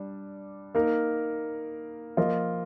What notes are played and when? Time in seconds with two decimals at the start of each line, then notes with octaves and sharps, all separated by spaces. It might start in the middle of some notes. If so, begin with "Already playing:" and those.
Already playing: G3 D4
0.75 A#3 D#4 A#4
2.17 F3 A#3 F4 A#4 D#5